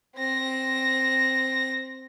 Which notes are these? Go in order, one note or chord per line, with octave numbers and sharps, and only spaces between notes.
C4 A#6